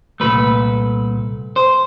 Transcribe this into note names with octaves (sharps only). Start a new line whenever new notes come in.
C2 A#2 F#3 A3 B4
C5